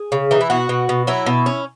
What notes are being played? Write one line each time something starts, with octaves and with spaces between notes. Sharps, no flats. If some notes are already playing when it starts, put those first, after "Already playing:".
Already playing: G#4
C#3
E3 D#4
E4
B2 F#4
B2
B2
F#3 E4
B2
C#4